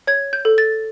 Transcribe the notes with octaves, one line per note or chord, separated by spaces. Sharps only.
C#5 G#6
G6
A4
A6